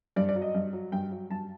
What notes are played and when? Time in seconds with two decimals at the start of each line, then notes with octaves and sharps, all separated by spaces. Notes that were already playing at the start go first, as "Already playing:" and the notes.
0.16 G2 D5
0.29 D5
0.36 F#3
0.42 D#5
0.55 G2
0.73 F#3
0.92 G2 G5
1.11 F#3
1.30 G2 A5